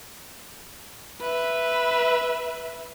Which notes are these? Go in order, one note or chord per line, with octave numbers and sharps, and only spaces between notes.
B4 E5